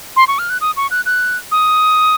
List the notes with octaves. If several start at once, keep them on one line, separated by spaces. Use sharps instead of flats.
C6
C#6
F6
F#6
D#6
C#6
F#6
F#6
D#6